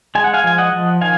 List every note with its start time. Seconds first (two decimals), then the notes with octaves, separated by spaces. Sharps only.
0.15 G#3 G#5
0.24 F#5
0.34 F5 G#5
0.44 F3 G#5
0.58 D#5 F#5
0.73 F3
1.01 D#3 F5 G#5